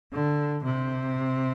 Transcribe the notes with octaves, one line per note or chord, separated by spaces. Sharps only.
D3
C3